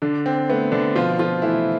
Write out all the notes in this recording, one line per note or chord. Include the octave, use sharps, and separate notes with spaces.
D3 D4
C4
A3 B3
D3 D4
B2 F3 F4
F3 F4
E3 A3 E4